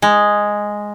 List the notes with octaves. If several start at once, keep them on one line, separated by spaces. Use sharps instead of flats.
G#3